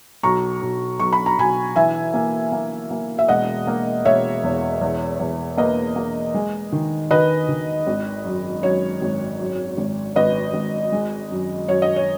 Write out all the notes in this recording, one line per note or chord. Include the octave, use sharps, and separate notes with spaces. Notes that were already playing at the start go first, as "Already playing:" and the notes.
B1 A#5 C#6
B1
B1 C#6
B5
A#5
B1 G#5 B5
E3 E5 G#5
A#3
A#3
A#3
E5
E1 D#5 F#5
A#3
E1 C#5 E5
E2
E2
E2
A#3 B4 D#5
A#3
G#3
D#3
D#3 B4 D#5
D#3
G#1
F#2
F#2 C#5
G#1
F#2
G#1
G#1 B4 D#5
G#1
G#3
F#2
F#2 C#5
D#5
C#5